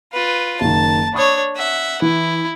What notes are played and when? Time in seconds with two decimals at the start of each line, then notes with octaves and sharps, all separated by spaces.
0.13 F4 B4
0.61 F#1 D#3 A5
1.14 D4 C#5 B5 C#6 D#6
1.57 E5 F#5
2.02 E3 E4